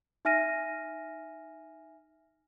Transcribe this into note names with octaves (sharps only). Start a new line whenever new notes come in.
D#4 E5 G#5 F6 A#6 D#7